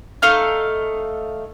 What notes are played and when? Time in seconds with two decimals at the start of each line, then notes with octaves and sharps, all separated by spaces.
0.22 A3 D#4 F5 F6